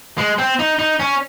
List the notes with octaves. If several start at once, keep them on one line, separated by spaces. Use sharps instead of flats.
G#3
C4
D#4
D#4
C#4